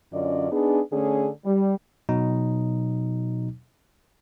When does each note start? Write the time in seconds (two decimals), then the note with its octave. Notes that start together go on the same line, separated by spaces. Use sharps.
0.12 F#2 D3 C#4 F4 D5 D#5
0.51 B3 D4 D#4 G#4
0.93 D3 A3 C#4 G#4
1.45 G3
2.09 B2 F#3 D#4